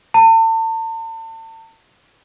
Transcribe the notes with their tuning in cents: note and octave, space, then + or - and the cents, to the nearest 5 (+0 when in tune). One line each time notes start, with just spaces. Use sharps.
A5 +40